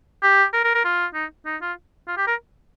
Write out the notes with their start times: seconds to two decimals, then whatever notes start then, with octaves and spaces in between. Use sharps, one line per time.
0.23 G4
0.53 A#4
0.64 A#4
0.74 A#4
0.85 F4
1.14 D#4
1.46 D#4
1.62 F4
2.08 F4
2.17 G4
2.27 A#4